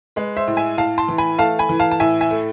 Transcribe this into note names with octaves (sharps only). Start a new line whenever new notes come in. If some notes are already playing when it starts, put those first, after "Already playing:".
G#3 B4
C5 E5
A2
E5 G#5
A2 F5 A5
A5 C6
E3
G#5 B5
A3 F5 A5
G#5 B5
E3
F5 A5
A5
A2 E5 G#5
E5 G#5
A3